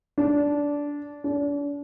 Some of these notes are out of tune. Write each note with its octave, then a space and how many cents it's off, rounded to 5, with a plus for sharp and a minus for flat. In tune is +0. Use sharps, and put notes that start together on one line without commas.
D4 -15
D4 -40